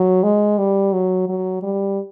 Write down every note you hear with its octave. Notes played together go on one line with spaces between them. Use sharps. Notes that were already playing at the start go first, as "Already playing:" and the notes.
Already playing: F#3
G#3
G3
F#3
F#3
G3